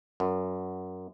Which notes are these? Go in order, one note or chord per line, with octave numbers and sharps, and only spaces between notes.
F#2